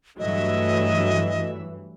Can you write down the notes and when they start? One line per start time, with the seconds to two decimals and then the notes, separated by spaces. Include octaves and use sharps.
0.19 G2 E3 F#3 A3 D#5 E5